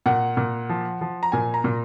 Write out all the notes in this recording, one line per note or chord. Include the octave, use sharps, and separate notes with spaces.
A#2 F#5
A#2
F3
F3
A#5
A#2 G#5
A#5
A#2